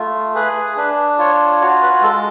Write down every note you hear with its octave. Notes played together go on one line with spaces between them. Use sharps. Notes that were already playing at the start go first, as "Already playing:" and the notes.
Already playing: A3 F4
G#4 B4
D4 B4
F4 C#5
F#4 C#5
B4
G#3 A4